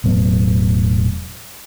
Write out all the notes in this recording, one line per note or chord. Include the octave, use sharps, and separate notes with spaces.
E1 A2 F#3 B3